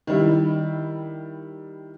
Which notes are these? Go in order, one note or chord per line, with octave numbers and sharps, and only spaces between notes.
D#3 G3 E4